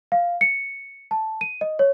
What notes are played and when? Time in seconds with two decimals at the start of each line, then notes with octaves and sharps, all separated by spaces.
0.12 F5
0.41 C#7
1.11 A5
1.41 D#7
1.61 D#5
1.79 C#5